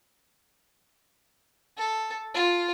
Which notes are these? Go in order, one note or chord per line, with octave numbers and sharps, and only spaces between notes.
A4
F4